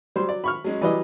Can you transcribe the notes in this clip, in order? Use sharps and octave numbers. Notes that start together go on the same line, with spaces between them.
F#3 G3 C5
D5
B5 C#6 F6
F#3 G#3 C#4
E3 F#3 G3 B4 D5 D#5